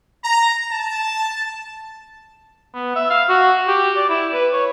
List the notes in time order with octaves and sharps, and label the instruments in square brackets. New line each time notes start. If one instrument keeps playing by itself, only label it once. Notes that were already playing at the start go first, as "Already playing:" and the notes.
[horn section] A#5
A5
[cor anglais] B3
E5
F5
F#4
G4
D5
E4
B4
C#5